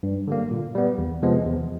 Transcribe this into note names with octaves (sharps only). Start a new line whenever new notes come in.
G2
D3 G3 A#3
A#2
G3 B3
E2
C3 F3 G#3 B3
E2